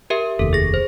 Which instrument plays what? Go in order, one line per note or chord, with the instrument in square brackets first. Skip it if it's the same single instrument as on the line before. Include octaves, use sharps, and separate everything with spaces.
[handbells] G4 A#4 E5
[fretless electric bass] F1 D#2 [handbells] A4
[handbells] G#4 A#6
C5